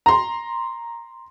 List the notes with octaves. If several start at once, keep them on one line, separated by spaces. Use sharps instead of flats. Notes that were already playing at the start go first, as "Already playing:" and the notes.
A#5 C6